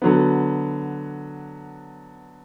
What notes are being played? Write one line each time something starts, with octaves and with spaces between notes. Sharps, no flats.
D3 F#3 B3